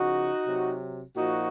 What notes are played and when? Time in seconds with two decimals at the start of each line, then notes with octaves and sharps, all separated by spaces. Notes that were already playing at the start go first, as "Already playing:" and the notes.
Already playing: C#3 F3 D#4 F#4
0.46 C3 F#3
1.16 A#2 F3 D#4 F#4